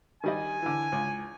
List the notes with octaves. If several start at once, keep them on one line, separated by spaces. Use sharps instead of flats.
D#3 G3 D#5 G#5
D3 E3
C#2